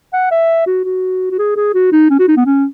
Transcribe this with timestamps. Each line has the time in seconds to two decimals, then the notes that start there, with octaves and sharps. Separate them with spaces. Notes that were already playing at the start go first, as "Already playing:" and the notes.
0.13 F#5
0.31 E5
0.67 F#4
0.85 F#4
1.31 F#4
1.39 G#4
1.56 G#4
1.74 F#4
1.92 D#4
2.10 C#4
2.19 F#4
2.28 D#4
2.37 B3
2.46 C#4